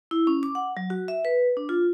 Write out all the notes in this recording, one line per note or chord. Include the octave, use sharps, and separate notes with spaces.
E4
C#4
D6
F#5
F#3
F#4
E5
B4
D4
F4